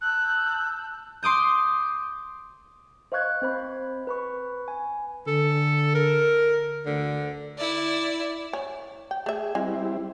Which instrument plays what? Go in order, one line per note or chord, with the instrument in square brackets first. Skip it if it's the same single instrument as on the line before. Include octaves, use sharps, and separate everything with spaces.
[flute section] A5 E6 G6 [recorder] F#6
[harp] C6 D6 D#6 G6
[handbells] C5 D#5 F5 C#6 F#6 G#6
C4 C5 B5
B4 B5 C#6
G#5
[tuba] D3 [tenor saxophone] A4
[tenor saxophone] A#4
[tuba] D2 [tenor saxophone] D3
[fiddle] E4 D5
[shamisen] C#4
G5
[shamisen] A3 E5 [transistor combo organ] G#4
[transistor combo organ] G3 C4 E4 [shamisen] G#3 G#5